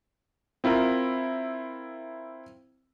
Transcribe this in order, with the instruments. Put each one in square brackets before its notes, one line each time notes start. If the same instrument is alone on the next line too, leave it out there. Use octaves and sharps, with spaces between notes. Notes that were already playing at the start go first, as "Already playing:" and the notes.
[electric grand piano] C4 E4 F4 A#4